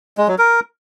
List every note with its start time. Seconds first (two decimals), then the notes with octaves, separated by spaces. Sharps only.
0.18 G#3
0.28 F#3
0.38 A#4